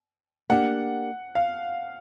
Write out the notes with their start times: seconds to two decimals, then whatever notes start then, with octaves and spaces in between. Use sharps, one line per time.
0.50 A#3 D4 G4 F#5
1.35 F5